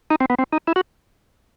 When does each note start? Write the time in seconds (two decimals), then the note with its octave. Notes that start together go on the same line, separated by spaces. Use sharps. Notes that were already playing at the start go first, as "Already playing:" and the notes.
0.11 D#4
0.20 C4
0.30 B3
0.39 C4
0.53 D#4
0.67 E4
0.76 F#4